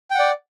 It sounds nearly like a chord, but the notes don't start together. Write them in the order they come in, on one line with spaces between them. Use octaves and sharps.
G5 F#5 D5